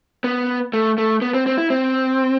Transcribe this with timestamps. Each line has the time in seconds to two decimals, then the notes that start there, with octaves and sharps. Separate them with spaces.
0.24 B3
0.73 A3
0.98 A3
1.22 B3
1.34 C4
1.46 C4
1.58 E4
1.70 C4